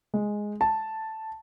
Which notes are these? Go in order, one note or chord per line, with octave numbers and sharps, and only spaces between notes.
G#3
A5